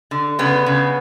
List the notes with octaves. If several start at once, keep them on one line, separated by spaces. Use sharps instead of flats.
D3
C#3 B3
C#3